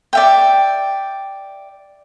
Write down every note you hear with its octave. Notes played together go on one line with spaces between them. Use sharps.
D5 E5 G5